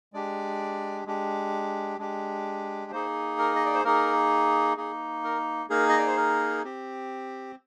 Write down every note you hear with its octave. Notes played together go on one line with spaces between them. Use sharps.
G#3 D4 G4 D5
G#3 D4 G4
G#3 D4 G4
A#3 D#4 G#4 C5
A#4
D#5
D5
C5
A#3 D#4 G#4 A#4
A#3 D#4 G#4
A#4
A#3 D#4 G#4 A#4
D#5
D5
C5
A#4
C4 G4